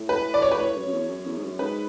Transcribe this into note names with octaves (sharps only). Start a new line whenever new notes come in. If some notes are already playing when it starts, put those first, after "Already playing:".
Already playing: A2
B4
D5
C#5
B4
A2 C#5
F#2
F#2
E2
F#2
E2
G#2
F#2
G#2 B4